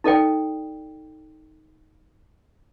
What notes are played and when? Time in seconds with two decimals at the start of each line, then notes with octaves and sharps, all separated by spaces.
0.04 D#4 A4 D5 G5